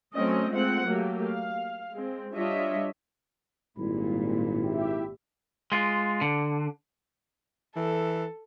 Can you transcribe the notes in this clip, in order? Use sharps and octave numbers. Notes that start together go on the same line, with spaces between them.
F#3 A3 C4 C#4 D#5
G#3 A3 C4 F4 F#5
F#3 A3 A#3 G4
F5
G#3 C4
G3 D4 F4 C#5 D#5 E5
G#1 A#2 G3 E4
G4 E5
G#3 F4
D3
E3 A4